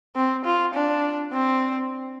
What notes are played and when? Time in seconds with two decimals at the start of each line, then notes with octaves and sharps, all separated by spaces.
0.16 C4
0.45 F4
0.74 D4
1.33 C4